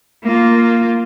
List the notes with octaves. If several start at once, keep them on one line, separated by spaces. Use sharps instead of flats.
A#3 F4